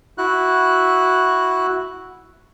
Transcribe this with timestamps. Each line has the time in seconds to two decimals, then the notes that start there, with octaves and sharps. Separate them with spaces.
0.18 E4 F#4 F#6